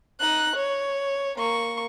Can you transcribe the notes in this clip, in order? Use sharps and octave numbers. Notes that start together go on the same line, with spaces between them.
D#4 F#6
C#5
A#3 C#6